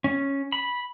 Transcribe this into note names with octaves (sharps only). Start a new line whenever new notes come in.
C#4
B5